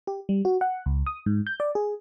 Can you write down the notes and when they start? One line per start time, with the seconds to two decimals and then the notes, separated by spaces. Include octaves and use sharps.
0.07 G4
0.29 G3
0.45 F#4
0.61 F#5
0.86 C#2
1.06 D#6
1.26 G#2
1.47 G6
1.60 D5
1.75 G#4